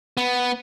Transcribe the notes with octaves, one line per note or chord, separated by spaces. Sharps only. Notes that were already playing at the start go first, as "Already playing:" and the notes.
B3